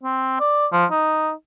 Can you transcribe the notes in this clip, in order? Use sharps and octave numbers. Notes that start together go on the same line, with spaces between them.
C4
D5
F3
D#4